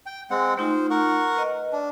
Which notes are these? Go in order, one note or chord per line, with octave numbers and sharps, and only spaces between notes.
G5
G#3 C4 F#5
A3 D#4 F4 C5
A#4 F#5 C#6
B4 D#5
D4